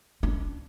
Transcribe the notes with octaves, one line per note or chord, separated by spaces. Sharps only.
D4